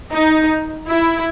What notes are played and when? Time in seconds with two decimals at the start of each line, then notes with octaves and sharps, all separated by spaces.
0.13 D#4
0.88 E4